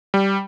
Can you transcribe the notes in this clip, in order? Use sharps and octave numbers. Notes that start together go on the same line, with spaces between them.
G3